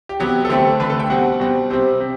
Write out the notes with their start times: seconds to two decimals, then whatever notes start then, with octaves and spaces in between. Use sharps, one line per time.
0.09 G4
0.19 C3 F#3 B3 G4
0.45 A4
0.49 D3 A3 C4 G4
0.65 A4
0.80 D3 A3 C4 B4
0.90 A4
1.00 G5
1.10 B2 G3 C4 F#5
1.40 B2 G3 C4
1.70 C3 G3 C4 C5
2.00 C3